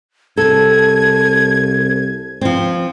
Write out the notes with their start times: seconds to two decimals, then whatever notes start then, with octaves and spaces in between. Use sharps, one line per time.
0.37 C2 A4 G#6
2.41 F3 C4